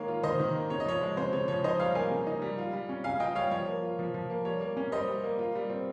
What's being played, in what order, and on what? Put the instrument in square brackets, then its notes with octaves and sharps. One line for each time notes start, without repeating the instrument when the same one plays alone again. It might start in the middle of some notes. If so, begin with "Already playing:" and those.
Already playing: [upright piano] D#3 G#3 A#3 C#5 F5
F4
D#3 C5 D#5
D#3
A#3
C#3 C#5
D#5
F3 C#5
G#3
C#3 C5
C#3 C#5
F3 C#5
D#4 C5 D#5
G3 C#5 F5
A#3 F5 G#5
C#3
D#4
G3
F4
G3
C#4
C#3 F5 G#5
F4 D#5 G5
G3 C#5 F5
F3 C#5
A#3
F4
F3
F3
A#3
G3 C#5
A#3
C#4
G3 C5 D#5
G3
A#3
F4
G3
C4